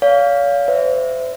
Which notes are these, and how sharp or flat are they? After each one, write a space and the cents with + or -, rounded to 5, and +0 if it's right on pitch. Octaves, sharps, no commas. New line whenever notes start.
C#5 +45 F5 +0
C5 -35 E5 +0